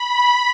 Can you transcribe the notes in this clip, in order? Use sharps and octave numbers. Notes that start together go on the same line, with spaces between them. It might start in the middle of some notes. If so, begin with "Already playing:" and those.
Already playing: B5